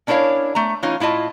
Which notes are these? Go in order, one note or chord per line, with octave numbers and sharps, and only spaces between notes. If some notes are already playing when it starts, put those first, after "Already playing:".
C#4 D4 E4 A#4 C#5 F5
A3 A#5
E3 C#4 D#4 F4
A2 E4 F4 D#5 A5